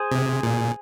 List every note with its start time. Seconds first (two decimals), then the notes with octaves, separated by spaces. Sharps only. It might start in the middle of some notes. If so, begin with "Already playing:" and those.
Already playing: G#4 C5
0.12 C3
0.43 A#2